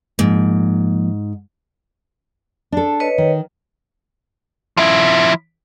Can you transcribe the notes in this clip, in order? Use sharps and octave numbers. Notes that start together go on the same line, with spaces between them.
G#2 F3 A#3
D4 A4
B4 C#5 D#5
D#3
F3 E4